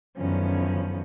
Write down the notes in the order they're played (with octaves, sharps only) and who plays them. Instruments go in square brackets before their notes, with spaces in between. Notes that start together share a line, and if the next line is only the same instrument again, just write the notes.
[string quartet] F#2 D3 D#3 F3 B3 C#4